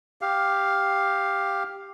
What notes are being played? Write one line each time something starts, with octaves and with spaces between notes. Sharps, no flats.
G4 F5